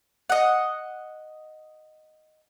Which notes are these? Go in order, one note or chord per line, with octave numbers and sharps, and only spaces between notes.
D#5 F#5